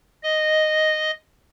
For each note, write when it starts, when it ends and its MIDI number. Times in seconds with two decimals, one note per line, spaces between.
0.23 1.11 75